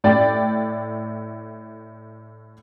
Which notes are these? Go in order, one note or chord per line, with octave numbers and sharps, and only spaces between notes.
A2 D5 G5